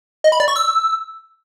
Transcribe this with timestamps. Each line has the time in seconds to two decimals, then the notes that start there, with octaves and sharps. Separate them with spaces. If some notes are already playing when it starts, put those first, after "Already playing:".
0.24 D#5
0.32 B5
0.40 D5
0.48 C#6
0.56 E6